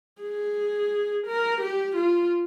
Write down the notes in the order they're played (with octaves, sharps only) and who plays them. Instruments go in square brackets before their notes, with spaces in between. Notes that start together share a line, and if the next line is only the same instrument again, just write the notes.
[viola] G#4
A#4
G4
F4